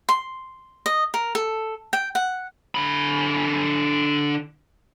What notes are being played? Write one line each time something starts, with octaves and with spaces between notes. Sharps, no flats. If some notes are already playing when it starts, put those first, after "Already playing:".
C6
D#5
A#4
A4
G5
F#5
D3 B5